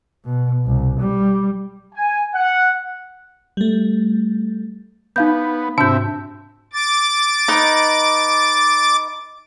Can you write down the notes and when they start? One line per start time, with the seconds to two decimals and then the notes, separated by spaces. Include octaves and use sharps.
0.25 B2
0.66 C2
1.00 G3
1.95 G#5
2.35 F#5
3.57 G3 A3
5.16 B3 D#4 F5 G6
5.78 G#2 C3 D4 E5 A5 G6
6.73 D6 A6
7.48 D#4 B4 D#5